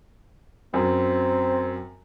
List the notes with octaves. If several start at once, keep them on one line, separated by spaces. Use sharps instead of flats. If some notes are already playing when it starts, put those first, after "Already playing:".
F#2 C4